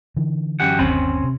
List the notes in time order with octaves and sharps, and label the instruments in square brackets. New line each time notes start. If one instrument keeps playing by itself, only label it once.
[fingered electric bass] D3 E3
[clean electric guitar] F#2 G4 F#5
[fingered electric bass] G1 D#2 [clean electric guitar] C4 C#4 B5
[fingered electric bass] C3